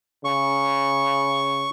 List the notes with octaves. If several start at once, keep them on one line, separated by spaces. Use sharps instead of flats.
C#3 C#6